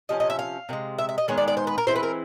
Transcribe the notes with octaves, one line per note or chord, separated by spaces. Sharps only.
C3 F3 C#4 D#5
D#5
E5
F5
C3 D#3 G#3
E5
E5
D#5
D#3 G#3 B3 C#5
D5
D5
C5
B4
A#4
E3 G#3 C4 E4 C5
B4
A#4